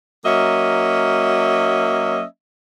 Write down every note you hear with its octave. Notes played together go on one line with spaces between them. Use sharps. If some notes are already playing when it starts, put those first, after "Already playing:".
F#3 A#3 C#4 D#5 E5